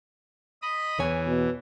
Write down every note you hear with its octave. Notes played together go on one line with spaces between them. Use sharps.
D#5 B5 D#6
E2 E3 C#5 G#5
B2